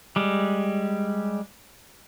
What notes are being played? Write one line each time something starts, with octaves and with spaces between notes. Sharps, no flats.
G3 G#3